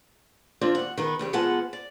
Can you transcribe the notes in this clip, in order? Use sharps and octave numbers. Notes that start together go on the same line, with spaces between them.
F3 C4 D4 F4 E5
D#2 F#5
D#3 B3 B4
E2 C#3 G4
B2 F3 G#3 B3 F#5 A5
D5